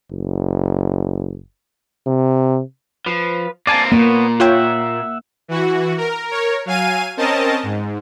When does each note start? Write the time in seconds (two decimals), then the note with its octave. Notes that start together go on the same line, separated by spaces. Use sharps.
0.11 F#1
2.07 C3
3.06 F3 B4
3.67 A#3 C4 D5 G#5 A5
3.92 A#2 A#3 B3 C#5
4.40 F4 C#5 E5 F#5 G5
5.48 E3 F#4
5.98 A#4
6.29 A#4 C#5
6.65 F#3 F5 G#5 D#7
7.17 C4 C#4 A#4 D#5 A5
7.63 G#2